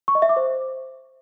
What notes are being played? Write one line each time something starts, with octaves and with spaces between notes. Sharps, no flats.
C#6
D#5
E5
D6
C5